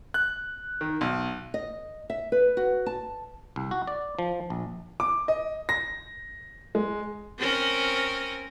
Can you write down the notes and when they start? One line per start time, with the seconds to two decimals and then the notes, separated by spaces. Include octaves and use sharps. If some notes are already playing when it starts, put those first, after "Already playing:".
0.14 F#6
0.81 D#3
1.01 B1
1.54 D#5
2.10 E5
2.32 B4
2.57 F#4
2.86 A5
3.56 C2
3.71 F#4
3.87 D5
4.19 F3
4.50 A#1
5.00 D6
5.28 D#5
5.69 A#6
6.75 G#3
7.38 C4 C#4 A#4